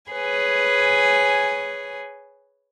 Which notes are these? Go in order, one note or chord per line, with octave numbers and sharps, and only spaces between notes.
G#4 B4 C#5 G#5